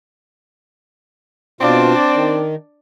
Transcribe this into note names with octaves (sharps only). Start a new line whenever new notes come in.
B2 C4 D4 F4 D5
D#3